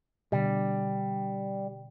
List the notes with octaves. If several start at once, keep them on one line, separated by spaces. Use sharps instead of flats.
B2 D3 G3